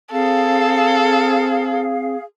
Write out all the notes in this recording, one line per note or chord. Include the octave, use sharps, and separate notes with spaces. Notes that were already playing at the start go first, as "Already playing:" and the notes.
C4 G#4 A4 F5